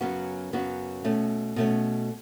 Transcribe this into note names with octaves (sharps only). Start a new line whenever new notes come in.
F#2 C#3 F#3 B3 F#4
F#2 C#3 F#3 B3 F#4
B2 A3 C#4
B2 A3 C#4